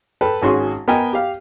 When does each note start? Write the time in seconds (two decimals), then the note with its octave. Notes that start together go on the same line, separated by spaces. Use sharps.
0.21 A4 B4 G5 A5
0.42 G#1 C#4 F#4 G#4 C6 C#6
0.88 B3 A#4 D#5 G5 G#5
1.13 G4 F5